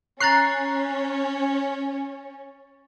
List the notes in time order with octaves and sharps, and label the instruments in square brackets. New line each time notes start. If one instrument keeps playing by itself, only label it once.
[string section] C#4 [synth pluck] A#5 F#6 C7 [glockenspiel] C#6 A6